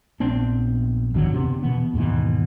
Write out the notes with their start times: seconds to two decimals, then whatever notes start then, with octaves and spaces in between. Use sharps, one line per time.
0.20 A#1 B3 C4 D4
1.14 G#1 D#2 D3 F#3
1.33 F#1 C3 B3 D4
1.63 B2 E3 B3
1.94 D#2 G#2 B2 E3